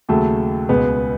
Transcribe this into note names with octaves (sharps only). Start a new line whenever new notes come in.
D#2 C#3 F#3 A3
C#2 B2 G#3 B3 B4